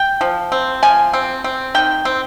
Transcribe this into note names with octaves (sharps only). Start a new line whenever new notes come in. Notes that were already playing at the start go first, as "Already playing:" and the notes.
Already playing: G5
F3
C4
F3 G#5
C4
C4
D#3 G5
C4